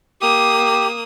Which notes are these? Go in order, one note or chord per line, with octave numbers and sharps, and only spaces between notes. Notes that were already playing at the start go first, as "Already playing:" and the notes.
A#3 G4 D#6